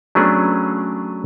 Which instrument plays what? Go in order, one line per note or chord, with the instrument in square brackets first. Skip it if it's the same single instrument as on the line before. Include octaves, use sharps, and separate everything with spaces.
[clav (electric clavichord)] F#3 A3 B3 C#4 D4 G#4